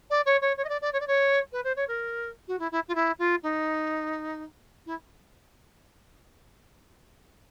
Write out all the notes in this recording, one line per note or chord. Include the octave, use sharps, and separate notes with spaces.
D5
C#5
C#5
C#5
D#5
D5
D5
C#5
D5
C#5
B4
C5
C#5
A#4
F#4
E4
E4
F4
E4
F4
D#4
E4